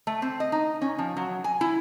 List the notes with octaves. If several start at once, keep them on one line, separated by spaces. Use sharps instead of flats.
A3
C4
D#5
D#4
C#4
F3
F#3
G#5
E4